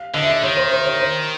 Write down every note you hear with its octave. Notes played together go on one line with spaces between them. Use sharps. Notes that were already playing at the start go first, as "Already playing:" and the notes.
Already playing: F5
D3 D#5
E5
D#5
D#3 C#5
C5
C5
C#5
C5